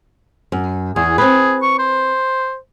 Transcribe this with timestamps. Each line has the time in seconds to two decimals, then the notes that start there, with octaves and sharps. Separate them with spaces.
0.52 F#2
0.96 E2 G#4
1.18 C4 G#4 B4
1.62 C#6
1.79 C5